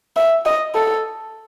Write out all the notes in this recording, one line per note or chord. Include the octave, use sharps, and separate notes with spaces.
E5
D#5
A4